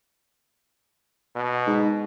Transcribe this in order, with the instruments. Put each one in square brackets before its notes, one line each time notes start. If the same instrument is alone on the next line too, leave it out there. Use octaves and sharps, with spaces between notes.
[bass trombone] B2
[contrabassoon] G#2